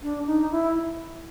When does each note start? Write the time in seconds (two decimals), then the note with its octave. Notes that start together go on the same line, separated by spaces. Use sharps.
0.02 D4
0.26 D#4
0.51 E4